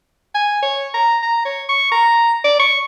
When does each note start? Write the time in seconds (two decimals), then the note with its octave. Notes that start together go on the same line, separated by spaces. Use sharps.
0.35 G#5
0.62 C#5
0.94 A#5
1.22 A#5
1.45 C#5
1.69 C#6
1.92 A#5
2.44 D5
2.60 C#6